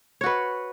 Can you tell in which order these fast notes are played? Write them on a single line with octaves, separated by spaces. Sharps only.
C#5 F#4 B4